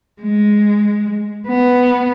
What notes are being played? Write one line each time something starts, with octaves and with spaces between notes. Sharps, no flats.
G#3
B3